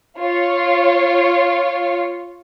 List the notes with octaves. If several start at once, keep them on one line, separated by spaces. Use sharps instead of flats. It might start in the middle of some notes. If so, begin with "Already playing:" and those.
F4 C#5